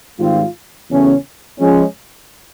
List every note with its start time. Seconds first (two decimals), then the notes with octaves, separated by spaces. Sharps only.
0.19 G#2 D#3 G3 C4 F4
0.90 E2 C#3 F#3 A3 C#4
1.59 F3 G#3 C#4